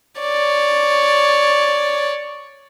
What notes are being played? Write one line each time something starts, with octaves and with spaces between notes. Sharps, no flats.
C#5 D5